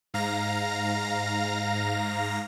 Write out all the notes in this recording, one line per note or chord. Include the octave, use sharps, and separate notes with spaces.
G#2 F5 A#5 A#6